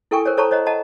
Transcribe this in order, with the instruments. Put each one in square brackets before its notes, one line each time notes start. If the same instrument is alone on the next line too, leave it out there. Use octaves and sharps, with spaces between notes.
[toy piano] E4 A4 A#4 G5 G#5 C#6
A#4 C5 C#5
A4 C5 C#5 A5 A#5 C#6
C5 C#5 D#5 F#5 A#5
D#5 F#5 A5 A#5